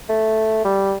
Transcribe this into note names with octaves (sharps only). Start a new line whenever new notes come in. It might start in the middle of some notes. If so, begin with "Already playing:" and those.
A3
G3